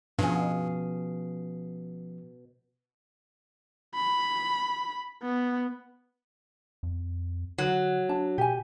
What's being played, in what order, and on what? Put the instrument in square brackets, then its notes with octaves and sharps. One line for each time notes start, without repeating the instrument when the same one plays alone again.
[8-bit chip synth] G2 [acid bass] B2 [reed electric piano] F3 C#4 [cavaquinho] G#4 F5
[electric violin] B5
B3
[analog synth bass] F2
[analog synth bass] D3 [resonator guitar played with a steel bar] F#3
[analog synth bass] D4 [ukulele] A5
[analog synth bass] B2 [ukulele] G4 G#5